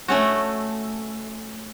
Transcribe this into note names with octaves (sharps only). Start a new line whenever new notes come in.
A3 C#4 F#4